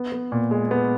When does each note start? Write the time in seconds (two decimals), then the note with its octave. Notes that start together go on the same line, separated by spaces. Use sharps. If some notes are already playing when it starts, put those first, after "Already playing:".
Already playing: B3
0.12 B3
0.32 A#2
0.51 G#3
0.71 B3